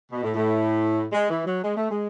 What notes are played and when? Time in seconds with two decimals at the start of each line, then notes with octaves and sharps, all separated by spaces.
0.12 B2
0.23 A2
0.34 A2
1.13 G#3
1.29 E3
1.46 F#3
1.63 G#3
1.77 A3
1.91 G#3